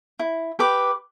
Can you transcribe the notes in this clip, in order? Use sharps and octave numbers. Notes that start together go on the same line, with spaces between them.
E4
G4 B4 D6